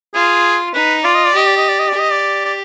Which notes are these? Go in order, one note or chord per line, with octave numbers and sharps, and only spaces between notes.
F4 G#4
D#4 B4
F4 D5
D#5
D5
G4 D#5
D5
D#5
D5
D#5
G4 D5
D#5
D5
D5